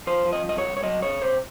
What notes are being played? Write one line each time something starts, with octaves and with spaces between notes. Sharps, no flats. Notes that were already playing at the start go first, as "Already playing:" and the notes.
F3 C5
F3
D#5
C2 D#5
C#5
C2
C#5
F#3 D#5
C3 C#5
C3 C5